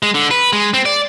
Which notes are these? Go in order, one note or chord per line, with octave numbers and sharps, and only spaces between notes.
G#3
D3
B4
G#3
C4
D5